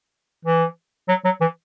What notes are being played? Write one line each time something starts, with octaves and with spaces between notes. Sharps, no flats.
E3
F#3
F#3
E3